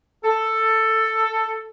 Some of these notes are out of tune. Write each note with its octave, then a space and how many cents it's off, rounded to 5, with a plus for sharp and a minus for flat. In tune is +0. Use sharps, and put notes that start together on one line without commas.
A4 +10